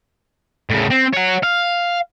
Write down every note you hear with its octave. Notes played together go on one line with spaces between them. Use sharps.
A2 C#3
C4
C#5 F#5
F5